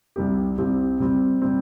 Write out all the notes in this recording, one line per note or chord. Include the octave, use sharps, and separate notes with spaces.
C2 C3 G3 C4 G4
C2 C3 G3 C4 G4
C3 G3 C4
C3 G3 C4